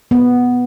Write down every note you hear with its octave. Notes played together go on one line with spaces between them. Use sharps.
B3